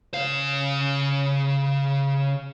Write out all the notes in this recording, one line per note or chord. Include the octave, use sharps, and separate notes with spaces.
C#3 F5